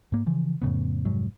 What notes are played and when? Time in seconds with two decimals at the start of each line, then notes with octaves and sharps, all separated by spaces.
0.12 G#2 A#3
0.26 C#3 E3 F3
0.62 F2 A2 C#3 B3
1.05 F1 G#2 F#3